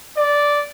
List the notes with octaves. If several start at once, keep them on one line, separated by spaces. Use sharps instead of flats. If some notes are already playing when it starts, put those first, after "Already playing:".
D5